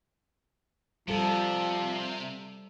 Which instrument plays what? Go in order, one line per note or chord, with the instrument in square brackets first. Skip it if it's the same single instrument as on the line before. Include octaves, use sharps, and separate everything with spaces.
[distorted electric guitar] C3 [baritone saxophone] F3 [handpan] G3 A4